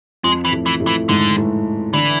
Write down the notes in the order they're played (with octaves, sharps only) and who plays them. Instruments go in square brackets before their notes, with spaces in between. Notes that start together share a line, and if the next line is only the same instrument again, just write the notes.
[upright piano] F2 F3 [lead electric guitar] G#3
[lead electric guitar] E3
[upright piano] A2 A3
[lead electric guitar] E3
[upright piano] A2 A3
[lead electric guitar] E3
[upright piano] G#2 G#3 [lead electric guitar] D3
[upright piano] A2 A3
[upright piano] D3 D4 [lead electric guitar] E3